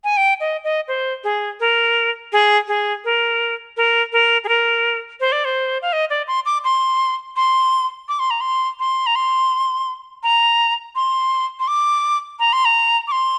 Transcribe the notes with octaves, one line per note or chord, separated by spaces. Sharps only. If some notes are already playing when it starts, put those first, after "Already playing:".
G#5
G5
D#5
D#5
C5
G#4
A#4
G#4
G#4
A#4
A#4
A#4
G#4
A#4
C5
D5
C5
F5
D#5
D5
C6
D6
C6
C6
D6
C6
A#5
C6
C6
A#5
C6
A#5
C6
C6
D6
A#5
C6
A#5
D6
C6